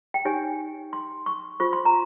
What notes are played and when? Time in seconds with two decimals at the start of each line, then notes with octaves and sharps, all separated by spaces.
0.14 G5
0.25 D#4 G4 C#5 G#5
0.93 C6
1.26 C#6
1.60 F4 C5 C#6
1.73 C6
1.85 A#5